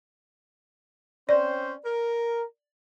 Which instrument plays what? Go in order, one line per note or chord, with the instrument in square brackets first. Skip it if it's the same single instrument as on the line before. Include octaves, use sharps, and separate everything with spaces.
[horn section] C4 C#4 C5 [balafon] D5
[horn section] A#4